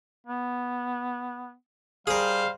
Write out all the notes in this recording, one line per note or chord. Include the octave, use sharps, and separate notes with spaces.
B3
G3 G#4 A#4 C5 F5